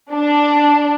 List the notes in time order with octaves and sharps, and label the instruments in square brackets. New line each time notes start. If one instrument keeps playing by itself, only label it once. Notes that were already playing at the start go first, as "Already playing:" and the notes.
[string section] D4